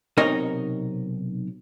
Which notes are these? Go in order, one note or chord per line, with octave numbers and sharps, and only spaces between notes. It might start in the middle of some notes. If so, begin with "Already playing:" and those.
B1 C3 D#4 A#4 C#5 D#5